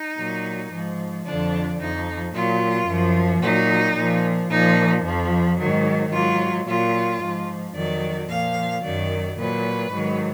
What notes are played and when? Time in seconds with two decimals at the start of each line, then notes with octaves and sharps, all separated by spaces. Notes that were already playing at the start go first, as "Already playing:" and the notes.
Already playing: D#4
0.17 A#2 F#3
0.72 G#2 F3
1.25 F2 D3 F3 D4
1.80 F2 F3 D#4
2.33 A#2 F#3 F4
2.87 F#2 F3
3.42 A#2 F#3 D#4
3.96 A#2 F3
4.50 A#2 F3 D#4
5.04 F2 F3
5.58 G#2 D#3 F#3
6.12 G#2 F#3 F4
6.66 A#2 F#3 F4
7.21 G#2 F3
7.74 F2 D#3 F#3 D5
8.28 A#2 F3 F5
8.83 F#2 D#3 F#3 D5
9.37 A#2 F#3 B4
9.91 G#2 D#3 F#3